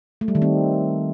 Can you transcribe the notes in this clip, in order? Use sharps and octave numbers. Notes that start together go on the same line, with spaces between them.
A3
G3
D#3
C4